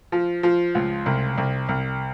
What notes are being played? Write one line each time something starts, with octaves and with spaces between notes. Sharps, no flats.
F3
F3
C#2
C2
C2
C2